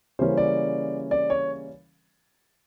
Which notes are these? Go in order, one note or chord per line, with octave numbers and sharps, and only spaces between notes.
C#3 E3 G3 A#3 C#4 C5
D5
D5
C#5